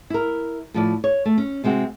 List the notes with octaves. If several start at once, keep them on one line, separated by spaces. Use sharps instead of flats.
E4 A#4
A2 F3 D5
C#5
A3
C#4
C3 G#3 C4 F#4 F#5